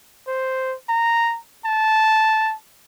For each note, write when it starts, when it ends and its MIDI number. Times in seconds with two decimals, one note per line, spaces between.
0.28 0.75 72
0.89 1.38 82
1.65 2.54 81